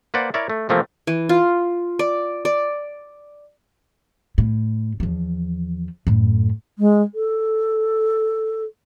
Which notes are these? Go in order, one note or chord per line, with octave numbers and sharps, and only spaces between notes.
A#3 B4 C5 D5 F#5
E4 A#4 C#5 D5 E5
A3
C3 E3 F3 A3 A#3 C4
E3
F4
D5
D5
A2
E2 F3
F#2 A2
G#3
A4